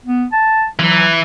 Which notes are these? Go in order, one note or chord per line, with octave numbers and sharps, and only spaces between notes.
B3
A5
E3 F#3